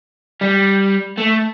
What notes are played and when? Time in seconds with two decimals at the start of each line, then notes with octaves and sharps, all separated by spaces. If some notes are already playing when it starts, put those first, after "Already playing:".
0.41 G3
1.17 A3